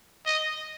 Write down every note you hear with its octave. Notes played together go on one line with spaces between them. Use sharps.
D#5